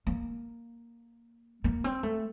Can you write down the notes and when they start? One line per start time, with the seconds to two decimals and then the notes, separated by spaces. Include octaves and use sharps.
0.07 A#3
1.64 A#3
1.84 C4
2.03 A3